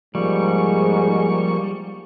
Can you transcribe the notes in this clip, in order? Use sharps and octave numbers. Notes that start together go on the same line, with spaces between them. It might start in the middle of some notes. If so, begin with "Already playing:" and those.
G#2 F3 G3 A#3 C#6